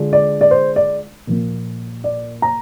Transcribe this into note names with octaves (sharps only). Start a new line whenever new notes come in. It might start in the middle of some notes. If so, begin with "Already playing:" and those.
Already playing: D3 G#3 D4 F4
D5
D5
C5
D5
A#2 F3 A#3
D5
A#5